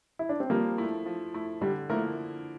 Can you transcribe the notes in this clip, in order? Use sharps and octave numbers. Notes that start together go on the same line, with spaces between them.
E4
D4
C4
F3 G3 A#3
A3 E4
F3
A3 E4
D3 G3
F3 A3 A#3 E4 A#4